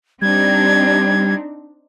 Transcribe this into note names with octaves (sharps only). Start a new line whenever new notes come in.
G3 C4 D4 D#4 G#6